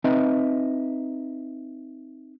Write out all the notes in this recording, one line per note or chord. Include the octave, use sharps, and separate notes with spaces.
C4 D#4 B4 D#5 E5